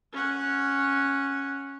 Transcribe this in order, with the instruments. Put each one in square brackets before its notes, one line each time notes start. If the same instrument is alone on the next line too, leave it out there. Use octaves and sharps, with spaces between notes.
[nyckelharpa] C#4 F#5